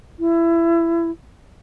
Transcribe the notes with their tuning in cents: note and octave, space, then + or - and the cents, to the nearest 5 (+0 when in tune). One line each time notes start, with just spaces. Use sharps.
E4 +20